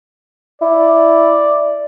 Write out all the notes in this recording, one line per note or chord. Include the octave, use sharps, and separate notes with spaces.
E4 D5